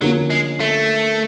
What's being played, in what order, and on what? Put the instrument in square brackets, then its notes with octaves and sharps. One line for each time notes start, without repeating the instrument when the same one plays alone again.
[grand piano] D3 F3 A#3 C#4 [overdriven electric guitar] F#3
[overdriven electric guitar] G#3
A3